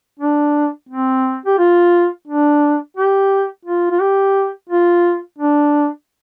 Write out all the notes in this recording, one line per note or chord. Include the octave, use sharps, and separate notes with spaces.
D4
C4
G4
F4
D4
G4
F4
F4
G4
F4
D4